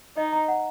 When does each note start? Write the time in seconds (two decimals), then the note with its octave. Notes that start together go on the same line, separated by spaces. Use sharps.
0.17 D#4 D#5
0.33 A#5
0.48 F#5